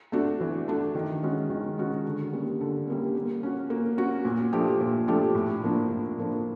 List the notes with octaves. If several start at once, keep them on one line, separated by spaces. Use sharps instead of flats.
A3 D4 F#4
E3
A3 D4 F#4
D#3
G#3 C#4 F#4
D#3
G#3 C#4 F#4
D3
G3 A#3 C#4
D3
G3 A#3 C#4
A#3
C#4 F#4
A#3
C#4 F#4
A#2
F3 A3 D4 G4
A#2
F3 A3 D4 G4
A2
F3 A#3 D4
A2
F3 A#3 D4